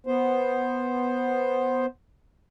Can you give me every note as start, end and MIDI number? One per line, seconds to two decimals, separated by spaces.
0.07 1.86 59
0.07 1.86 72